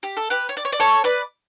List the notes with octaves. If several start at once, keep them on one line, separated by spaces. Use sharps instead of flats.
G4
A4
G4 B4
C#5
D5
C#5
D5
A4 C#5
B4 D5